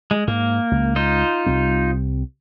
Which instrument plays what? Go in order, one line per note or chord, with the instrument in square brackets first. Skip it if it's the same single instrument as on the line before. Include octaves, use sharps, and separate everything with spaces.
[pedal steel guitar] G#3
[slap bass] G#2 [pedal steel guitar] A#3
[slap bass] C#2
[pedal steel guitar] D#4 F4 C5
[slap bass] C2 G3 C4